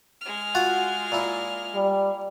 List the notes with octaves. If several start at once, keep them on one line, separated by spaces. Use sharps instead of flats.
G#3 F6
F4 F#4 F#5
A#2 E4
G3